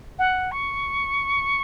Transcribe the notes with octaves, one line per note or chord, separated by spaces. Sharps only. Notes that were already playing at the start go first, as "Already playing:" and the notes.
F#5
C#6